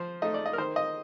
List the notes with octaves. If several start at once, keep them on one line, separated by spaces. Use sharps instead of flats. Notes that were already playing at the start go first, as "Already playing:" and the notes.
Already playing: F3 C5
A3 D#4 D#5
D5
D#5
A#4
D#3 C5
D#5